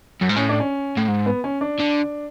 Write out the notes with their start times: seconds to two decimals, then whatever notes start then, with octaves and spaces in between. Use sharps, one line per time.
0.21 F#2
0.29 G#2
0.36 A2 C#4
0.49 D4
0.60 C#4
0.97 A2
1.08 G#2
1.26 B3
1.44 C#4
1.61 D4
1.79 D3